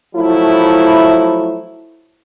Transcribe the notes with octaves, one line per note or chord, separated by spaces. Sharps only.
F3 F#3 A3 E4